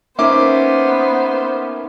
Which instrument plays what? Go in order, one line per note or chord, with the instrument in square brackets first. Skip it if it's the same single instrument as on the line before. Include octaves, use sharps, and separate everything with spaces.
[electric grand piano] A#3 C#4 D6 [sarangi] B3 [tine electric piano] D#4 E5 [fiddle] C5